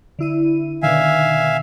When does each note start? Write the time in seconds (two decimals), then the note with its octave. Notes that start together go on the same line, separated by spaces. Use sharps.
0.19 D3 E4 D#7
0.83 B2 D3 D#3 E5 F5 G#5